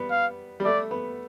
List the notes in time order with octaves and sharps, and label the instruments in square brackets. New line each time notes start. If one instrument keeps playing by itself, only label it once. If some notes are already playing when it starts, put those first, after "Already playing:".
Already playing: [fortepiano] G3 B3
[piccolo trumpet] F5
[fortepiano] G3
[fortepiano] A3 [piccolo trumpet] D5
[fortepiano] B3